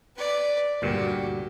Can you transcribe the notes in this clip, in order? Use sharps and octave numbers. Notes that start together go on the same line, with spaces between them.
B4 D5
D2 G2 A#2 F#4 G4